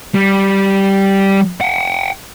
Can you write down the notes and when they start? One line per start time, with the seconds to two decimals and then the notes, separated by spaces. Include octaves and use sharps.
0.14 G3
1.61 F#5 G5